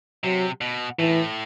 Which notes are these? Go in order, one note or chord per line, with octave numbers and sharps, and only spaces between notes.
C3 F#3
B2
A2 E3